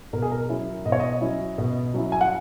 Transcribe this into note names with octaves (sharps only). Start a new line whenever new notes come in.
B2 A#4
G#4
A#4
F#3 C#4 E4
B2 D#5
C#5
D#5
F#3 C#4 E4
B2
F#3 C#4 E4
G#5
F#5